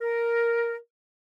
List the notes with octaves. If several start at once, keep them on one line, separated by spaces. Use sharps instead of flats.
A#4